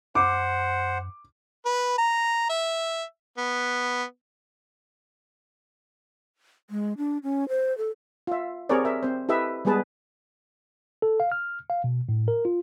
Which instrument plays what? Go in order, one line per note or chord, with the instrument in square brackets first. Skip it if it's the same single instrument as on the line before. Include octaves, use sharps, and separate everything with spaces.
[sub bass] F#2 [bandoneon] C5 F#5 [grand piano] D6
[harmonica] B4
A#5
E5
B3
[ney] G#3
D4
C#4
C5
A4
[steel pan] F4 E5
C4 G4 G#4 A#4 C#5 D5
A#4 E5
C4 C5
E4 G4 A4 B4 D#5 E5
G3 G#3 B3 G#4 B4 A5
[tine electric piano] A4
F5
F6
F5
B2
A2
A#4
F4